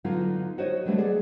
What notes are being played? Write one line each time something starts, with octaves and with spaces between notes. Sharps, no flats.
D3 F#3 B3 D#4 F4
F#4 C5 C#5 D#5
D3 D#3 F#3 G3 A3 B3
G#4 D5 F#5